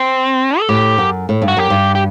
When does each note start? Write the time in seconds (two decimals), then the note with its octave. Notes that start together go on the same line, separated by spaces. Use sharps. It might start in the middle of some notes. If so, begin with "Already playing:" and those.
Already playing: C4
0.59 A4
0.69 A2 G4
0.98 F#2
1.29 A2
1.42 G2
1.48 F#4
1.57 F#2 G4
1.70 G2
1.95 G4